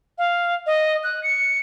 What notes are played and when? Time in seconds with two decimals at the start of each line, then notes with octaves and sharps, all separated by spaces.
0.18 F5
0.66 D#5
1.04 F#6
1.23 C#7